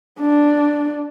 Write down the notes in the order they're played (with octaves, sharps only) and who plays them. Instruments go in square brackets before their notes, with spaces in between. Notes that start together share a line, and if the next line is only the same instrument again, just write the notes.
[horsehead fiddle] D4